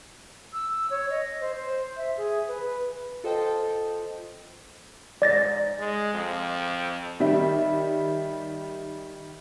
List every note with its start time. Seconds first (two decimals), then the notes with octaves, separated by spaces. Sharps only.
0.53 E6
0.90 C#5
1.10 D#5
1.40 C5
1.56 C5
1.97 E5
2.17 G#4
2.48 B4
3.24 F4 A4 C5 D#5 G5 A5
5.22 G#2 D5 A6 A#6
5.79 G#3
6.13 F2
7.20 D#3 G3 E5